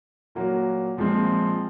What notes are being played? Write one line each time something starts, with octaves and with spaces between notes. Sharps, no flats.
A#2 F#3 A#3
A#2 F3 G#3 C4